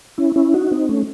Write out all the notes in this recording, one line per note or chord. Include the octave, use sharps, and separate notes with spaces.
C#4 E4
C#4 E4
D#4 F#4
C4 D#4
A3 C#4